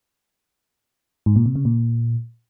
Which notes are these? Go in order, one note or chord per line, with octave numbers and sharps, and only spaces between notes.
G#2
A#2
C3
C#3
A#2